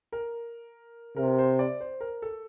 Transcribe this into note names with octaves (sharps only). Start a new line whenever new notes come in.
A#4
C3 A#4
C5
D5
C5
A#4
A4